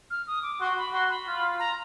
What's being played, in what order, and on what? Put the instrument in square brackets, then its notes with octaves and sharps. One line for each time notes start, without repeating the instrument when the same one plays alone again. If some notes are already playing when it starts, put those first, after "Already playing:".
[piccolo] F6
D#6
D6
[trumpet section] F#4 [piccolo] C6
[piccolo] B5
[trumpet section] F#4 [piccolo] C6
[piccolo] B5
[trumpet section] F4
[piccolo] A#5